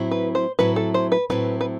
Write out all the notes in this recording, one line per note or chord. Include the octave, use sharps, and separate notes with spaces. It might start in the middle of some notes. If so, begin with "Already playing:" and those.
Already playing: A2 F#3 C4 E4
B4
C5
A2 F#3 C4 E4 B4
A4
C5
B4
A2 F#3 C4 E4 B4
B4